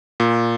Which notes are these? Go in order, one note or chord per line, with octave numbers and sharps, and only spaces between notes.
A#2